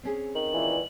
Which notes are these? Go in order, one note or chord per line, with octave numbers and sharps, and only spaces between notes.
C4 C#4 G#4
D#3 F#7
A#2 E3